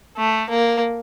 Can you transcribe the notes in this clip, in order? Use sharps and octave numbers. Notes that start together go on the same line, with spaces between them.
A3
A#3